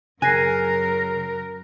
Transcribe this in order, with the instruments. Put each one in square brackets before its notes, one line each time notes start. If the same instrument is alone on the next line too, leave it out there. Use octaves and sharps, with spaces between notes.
[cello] F#2 A#4 [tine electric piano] C#3 [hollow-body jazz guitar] G#5 [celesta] F#6 A#6 C7